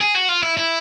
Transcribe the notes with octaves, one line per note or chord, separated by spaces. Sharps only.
G#4
F#4
F4
E4
E4